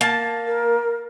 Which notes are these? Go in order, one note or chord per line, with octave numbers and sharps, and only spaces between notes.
A#3 A5
A#4